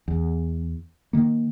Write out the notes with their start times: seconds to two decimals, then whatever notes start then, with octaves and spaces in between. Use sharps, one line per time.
0.08 E2
1.13 D#3 A#3